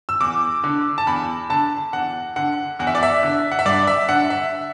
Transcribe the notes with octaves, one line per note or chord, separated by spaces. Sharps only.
E6
E2 D6
D3
A5
E2 B5
D3 A5
E2 F#5
D3 F#5
E2 F#5
E5
D5
E5
D3
F#5
E5
G2 D5
E5
D3 F#5
E5